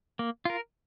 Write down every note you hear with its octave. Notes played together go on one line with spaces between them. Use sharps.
A#3
F4 A#4